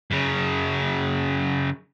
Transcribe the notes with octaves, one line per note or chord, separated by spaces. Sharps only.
F#2 C#3